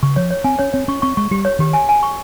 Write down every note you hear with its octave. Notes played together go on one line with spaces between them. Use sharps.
C#3 C#6
F3 C#5
C#5
C4 G#5
C#4 C#5
C4 C#5
C#4 C#6
C4 C#6
G#3 C#6
G3 G4
C#5
D#3 G4
G#5
G#5
C#6